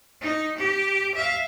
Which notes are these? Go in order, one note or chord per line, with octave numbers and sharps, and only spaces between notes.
D#4
G4
E5 F5